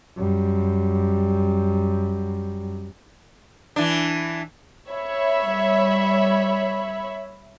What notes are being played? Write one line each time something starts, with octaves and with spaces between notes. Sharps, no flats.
F#2 G3
E3 D4
C#5 E5 B5
G3